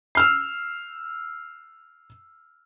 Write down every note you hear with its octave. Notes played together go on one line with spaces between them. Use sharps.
E6 F6 C7